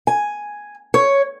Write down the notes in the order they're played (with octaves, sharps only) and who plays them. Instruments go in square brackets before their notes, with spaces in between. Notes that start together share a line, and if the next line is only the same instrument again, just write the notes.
[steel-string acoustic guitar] G#5
C#5